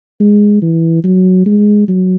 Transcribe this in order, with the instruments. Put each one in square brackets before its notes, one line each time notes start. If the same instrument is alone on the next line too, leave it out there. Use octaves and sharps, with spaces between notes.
[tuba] G#3
E3
F#3
G#3
F#3